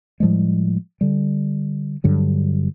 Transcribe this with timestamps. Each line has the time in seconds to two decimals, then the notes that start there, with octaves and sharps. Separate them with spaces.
0.20 A2 F3 G3 G#3
1.01 D3 G3
2.04 G2 D3 F#3